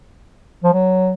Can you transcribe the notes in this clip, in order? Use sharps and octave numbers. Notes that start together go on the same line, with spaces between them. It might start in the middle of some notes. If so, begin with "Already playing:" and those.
F3
F#3